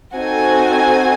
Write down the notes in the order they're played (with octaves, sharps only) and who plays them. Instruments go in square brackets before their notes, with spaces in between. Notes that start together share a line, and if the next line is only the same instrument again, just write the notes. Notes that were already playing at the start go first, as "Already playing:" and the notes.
[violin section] C4 D#4 F#4 A4 G#5